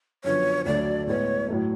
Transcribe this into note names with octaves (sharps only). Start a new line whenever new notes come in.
F#2 D3 F3 B3 C#5
D2 D3 F#3 A3 D5
A2 G#3 B3 C#5
A2 F#3 A3